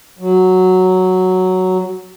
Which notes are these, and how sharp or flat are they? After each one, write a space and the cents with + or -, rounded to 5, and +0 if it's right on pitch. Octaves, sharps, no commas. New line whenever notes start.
F#3 +0